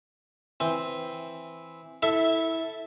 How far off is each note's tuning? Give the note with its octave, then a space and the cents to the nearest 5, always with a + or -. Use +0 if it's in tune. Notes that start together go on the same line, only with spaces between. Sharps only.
E3 +0 C4 +0
E4 -15 A4 +0 E5 +0